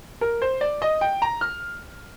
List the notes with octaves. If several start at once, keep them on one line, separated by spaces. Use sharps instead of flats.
A#4
C5
D5
D#5
G5
A#5
F6